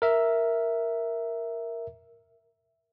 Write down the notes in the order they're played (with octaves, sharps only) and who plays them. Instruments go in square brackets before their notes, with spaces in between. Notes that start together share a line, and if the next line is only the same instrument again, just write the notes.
[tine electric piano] A#4 E5